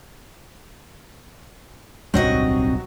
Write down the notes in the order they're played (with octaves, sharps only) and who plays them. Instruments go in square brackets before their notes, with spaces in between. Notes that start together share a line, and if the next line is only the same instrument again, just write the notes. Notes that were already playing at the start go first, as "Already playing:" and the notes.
[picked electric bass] D1 B1 G2 [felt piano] F#3 [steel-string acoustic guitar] C4 F#4 D#5